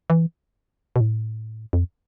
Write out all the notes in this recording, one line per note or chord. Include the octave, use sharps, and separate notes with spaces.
E3
B2
A2
F2